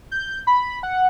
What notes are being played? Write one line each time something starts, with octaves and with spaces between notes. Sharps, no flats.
G6
B5
F#5